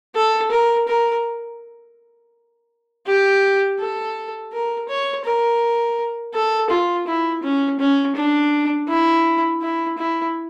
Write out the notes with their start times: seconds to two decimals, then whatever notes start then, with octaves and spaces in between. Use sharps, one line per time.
0.15 A4
0.51 A#4
0.88 A#4
3.07 G4
3.79 A4
4.52 A#4
4.89 C#5
5.25 A#4
6.34 A4
6.70 F4
7.07 E4
7.43 C#4
7.79 C#4
8.16 D4
8.89 E4
9.61 E4
9.98 E4